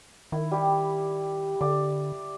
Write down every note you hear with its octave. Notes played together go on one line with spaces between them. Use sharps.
D#3 E4
G3 G4
D3 D5